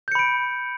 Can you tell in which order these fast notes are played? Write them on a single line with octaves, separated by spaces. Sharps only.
G6 C#7 B5 D7